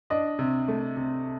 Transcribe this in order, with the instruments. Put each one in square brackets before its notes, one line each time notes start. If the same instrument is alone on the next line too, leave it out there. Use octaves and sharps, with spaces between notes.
[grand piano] D4 [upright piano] D#5
[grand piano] C3
A3
C3